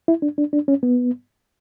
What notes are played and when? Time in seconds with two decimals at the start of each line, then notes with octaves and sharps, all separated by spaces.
0.08 E4
0.22 D4
0.38 D4
0.53 D4
0.68 C#4
0.83 B3